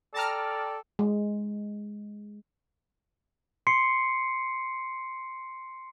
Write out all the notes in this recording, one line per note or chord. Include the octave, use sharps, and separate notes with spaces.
A4 D5 G5 A5 A#5 F6
G#3
C6 C7 C#7